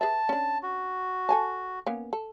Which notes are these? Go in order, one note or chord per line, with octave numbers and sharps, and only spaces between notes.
G#4 B4 E5 A5
C#4 D4
F#4
A4 G#5 A5
A#3 B3 C#4
A4